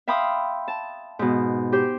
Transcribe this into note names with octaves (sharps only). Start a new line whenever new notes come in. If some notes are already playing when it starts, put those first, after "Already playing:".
E5 F5 G5 B5 C6 D#6
A5
G#2 B2
G4 C5